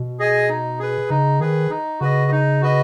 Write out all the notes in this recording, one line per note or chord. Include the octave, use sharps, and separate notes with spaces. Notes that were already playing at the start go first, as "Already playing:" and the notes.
Already playing: B2
G#4 D#5 G#5
D#4
G#4 B4
C#3 D#4
D#3 G#4 B4
D#4
C#3 F#4 B4 D#5
D#4
F#4 B4 D#5